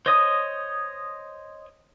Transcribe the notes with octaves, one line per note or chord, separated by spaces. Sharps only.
C5 C#5 D#5 D#6